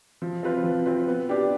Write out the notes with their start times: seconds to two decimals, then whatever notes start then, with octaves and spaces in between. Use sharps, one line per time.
0.22 F3
0.43 C4 F4 B4
0.64 F3
0.85 C4 F4 B4
1.08 B3
1.29 D4 G4 D5